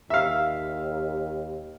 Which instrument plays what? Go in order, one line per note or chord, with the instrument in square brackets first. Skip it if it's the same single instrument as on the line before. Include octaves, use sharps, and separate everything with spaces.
[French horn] D#2 [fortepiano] E5 F5